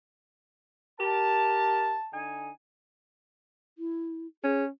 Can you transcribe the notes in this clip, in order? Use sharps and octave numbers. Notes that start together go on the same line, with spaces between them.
G4 A#4 A5
D3 D#4 G#5
E4
C#4 G#4